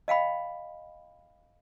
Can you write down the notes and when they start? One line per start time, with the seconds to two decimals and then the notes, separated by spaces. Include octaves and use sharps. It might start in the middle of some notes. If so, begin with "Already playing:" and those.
0.08 D#5 F5 G5 B5